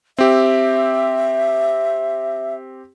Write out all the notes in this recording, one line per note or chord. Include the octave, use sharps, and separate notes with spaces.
C4 G4 E5